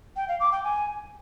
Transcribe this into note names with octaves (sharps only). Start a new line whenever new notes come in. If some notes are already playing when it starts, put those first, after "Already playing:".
G5
F5
D6
G5
G#5